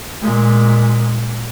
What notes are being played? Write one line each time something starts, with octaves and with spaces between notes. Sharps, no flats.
A#2 G#3